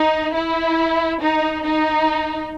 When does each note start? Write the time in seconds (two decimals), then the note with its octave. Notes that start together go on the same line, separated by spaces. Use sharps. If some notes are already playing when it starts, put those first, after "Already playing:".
Already playing: D#4
0.33 E4
1.21 D#4
1.64 D#4